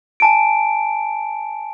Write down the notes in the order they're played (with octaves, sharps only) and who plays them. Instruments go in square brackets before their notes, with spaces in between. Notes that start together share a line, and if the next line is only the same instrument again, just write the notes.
[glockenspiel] G#5 A5 D7